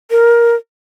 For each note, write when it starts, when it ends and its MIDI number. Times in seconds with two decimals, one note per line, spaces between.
0.11 0.54 70